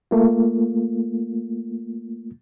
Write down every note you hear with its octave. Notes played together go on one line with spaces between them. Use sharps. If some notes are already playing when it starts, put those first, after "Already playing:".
A3 A#3 F4